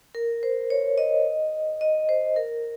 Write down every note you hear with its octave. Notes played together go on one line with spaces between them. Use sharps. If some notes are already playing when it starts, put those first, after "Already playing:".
A#4
C5
C#5
D#5
D#5
C5
A#4